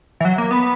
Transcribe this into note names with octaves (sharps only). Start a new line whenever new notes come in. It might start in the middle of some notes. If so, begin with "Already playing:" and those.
E3
F#3
A#3
B3